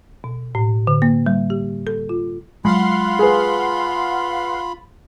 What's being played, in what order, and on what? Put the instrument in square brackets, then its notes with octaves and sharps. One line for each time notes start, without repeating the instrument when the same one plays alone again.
[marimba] B2
A2
D3
A#3
G3
G4
A4
F4
[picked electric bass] F#3 G#3 [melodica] F4 B5 [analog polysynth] F5 F#5 C6
[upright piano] G#4 B4